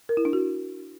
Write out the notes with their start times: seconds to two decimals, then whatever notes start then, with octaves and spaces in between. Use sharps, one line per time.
0.09 A#4
0.17 E4
0.25 D4
0.33 F#4